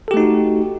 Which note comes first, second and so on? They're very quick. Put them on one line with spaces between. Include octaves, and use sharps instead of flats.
A4 G4 A3 D#4 F#4